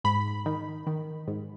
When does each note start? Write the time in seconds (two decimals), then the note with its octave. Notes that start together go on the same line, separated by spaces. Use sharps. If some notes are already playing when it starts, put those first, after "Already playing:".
0.04 G#2 B5
0.46 D#3
0.87 D#3
1.28 G#2